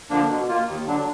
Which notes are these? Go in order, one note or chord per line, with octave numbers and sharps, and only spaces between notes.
D3 F3 A#3 D4
B2
A#3 F4
D#2
D3 F#3 D4